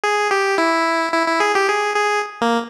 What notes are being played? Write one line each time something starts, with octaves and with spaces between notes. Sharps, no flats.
G#4
G4
E4
E4
E4
G#4
G4
G#4
G#4
A#3